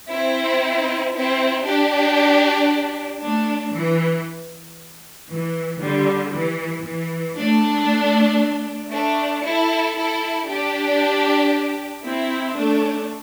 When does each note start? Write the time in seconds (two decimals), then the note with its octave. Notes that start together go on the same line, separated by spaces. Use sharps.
0.10 C4 E4
1.14 C4 E4
1.66 D4 G4
3.22 A3 D4
3.74 E3
5.30 E3
5.81 D3 G3
6.33 E3
6.85 E3
7.38 A3 D4
8.92 A3 D4
9.44 E4 A4
9.97 E4 A4
10.48 D4 G4
12.04 C4 E4
12.56 A3 D4